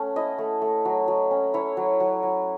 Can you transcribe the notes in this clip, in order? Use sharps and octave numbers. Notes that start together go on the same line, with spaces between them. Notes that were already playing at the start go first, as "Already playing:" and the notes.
Already playing: A3 C#4 F#5 A5
E4 D#5
A3
A3
F#3
F#3
C#4
E4 C#5
F#3
F#3
F#3